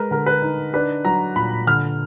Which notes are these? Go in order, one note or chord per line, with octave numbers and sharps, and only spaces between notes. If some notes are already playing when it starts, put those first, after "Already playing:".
Already playing: G#3 A#4 B4
D3 A#4
B4
D#4
D4 B4
F#3 A#5
A#2 B5
D3 F6